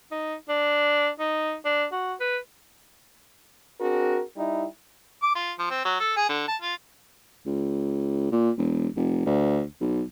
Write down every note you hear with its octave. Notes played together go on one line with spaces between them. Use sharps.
D#4
D4
D#4
D4
F#4
B4
C4 D4 F#4 G#4 A#4
G3 D#4 E4
D6
F4
F3
C4
F#3
A4
G#4
D3
A5
F4
C#2
A#2
E1
F1
D2
B1